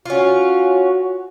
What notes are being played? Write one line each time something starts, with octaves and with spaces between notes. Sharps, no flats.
C#4 F4 F#4